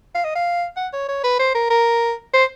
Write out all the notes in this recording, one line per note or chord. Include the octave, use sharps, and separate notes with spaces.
F5
D#5
F5
F#5
C#5
C#5
B4
C5
A#4
A#4
C5